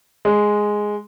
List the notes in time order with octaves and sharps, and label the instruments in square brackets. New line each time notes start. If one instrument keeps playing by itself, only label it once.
[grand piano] G#3